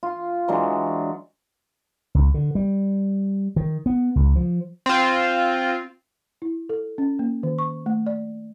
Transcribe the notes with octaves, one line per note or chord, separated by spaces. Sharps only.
F4
E3 F#3 G#3 D4
C#2
D3
G3
D#3
B3
C#2
F3
C4 F4
E4
A4
C#4
A#3
D#3
C#6
A3
D5